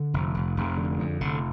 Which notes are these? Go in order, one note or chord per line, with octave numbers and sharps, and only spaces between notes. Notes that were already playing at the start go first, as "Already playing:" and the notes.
Already playing: D3
F1
F1
F1
D3
F2
F1 D3